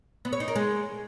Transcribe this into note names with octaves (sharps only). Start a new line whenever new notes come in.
B3
C#5
D#4
A#4
G#3